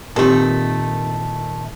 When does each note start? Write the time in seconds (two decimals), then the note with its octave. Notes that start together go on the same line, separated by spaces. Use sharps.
0.16 A#2 D#3 A3 C4 G4 A4 A#4